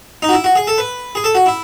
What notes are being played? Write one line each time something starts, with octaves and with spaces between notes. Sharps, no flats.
D#4
F#4
E4
F#4
G#4
A4
B4
G#4
A4
F#4
E4